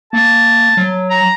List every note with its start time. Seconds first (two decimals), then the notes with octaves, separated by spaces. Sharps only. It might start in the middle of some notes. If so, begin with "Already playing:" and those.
0.13 A#3 A5
0.77 F#3
1.10 A#5